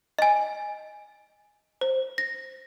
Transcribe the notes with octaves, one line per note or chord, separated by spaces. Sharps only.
D#5 G#5
C5
A#6